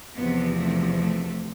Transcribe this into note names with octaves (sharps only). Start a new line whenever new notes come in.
E2 C3 F3 B3
A3
A3